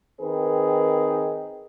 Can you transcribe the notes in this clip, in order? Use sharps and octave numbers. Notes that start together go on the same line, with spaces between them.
D#3 C4 G#4 A#4 B4